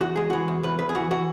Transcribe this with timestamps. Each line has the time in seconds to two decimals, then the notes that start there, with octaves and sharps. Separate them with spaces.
0.01 E2 F#4
0.16 G#3 G#4
0.30 E3 F#4
0.48 E2
0.63 E2 B4
0.79 E2 B4
0.89 G#4
0.95 E3 F#4
1.11 E3 F#4